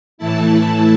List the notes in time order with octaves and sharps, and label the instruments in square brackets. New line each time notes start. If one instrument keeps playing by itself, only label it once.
[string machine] A2 E3 A3 E4 A5